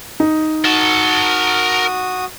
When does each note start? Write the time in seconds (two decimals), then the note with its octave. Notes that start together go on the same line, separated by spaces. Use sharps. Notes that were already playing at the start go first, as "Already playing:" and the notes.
0.20 D#4
0.65 F#4 A#4 A5 D#6